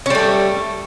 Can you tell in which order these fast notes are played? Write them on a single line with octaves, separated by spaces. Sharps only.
C#4 G3 A3